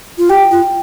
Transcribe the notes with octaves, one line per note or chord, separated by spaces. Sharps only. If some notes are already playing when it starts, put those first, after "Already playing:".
F4
G4 G5
F4